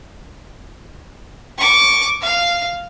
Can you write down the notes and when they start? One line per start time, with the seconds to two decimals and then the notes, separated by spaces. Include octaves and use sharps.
1.58 C#6 D6
2.21 F5